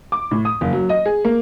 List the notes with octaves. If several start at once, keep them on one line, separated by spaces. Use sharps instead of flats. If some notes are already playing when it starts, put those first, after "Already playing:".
D6
A2
D#6
F#1
F#3
D#5
G#4
A#3